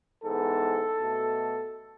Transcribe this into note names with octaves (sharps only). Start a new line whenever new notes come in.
G#2 E3 G#3 B3 A4
B2 A3